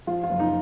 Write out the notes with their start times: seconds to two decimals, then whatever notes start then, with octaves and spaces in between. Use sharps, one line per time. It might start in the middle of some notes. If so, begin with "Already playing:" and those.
0.07 F3 F4
0.23 F4
0.29 F#1
0.39 D#4